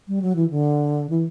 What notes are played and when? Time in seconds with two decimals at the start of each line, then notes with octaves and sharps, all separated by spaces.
0.08 G3
0.22 F#3
0.36 E3
0.50 D3
1.10 E3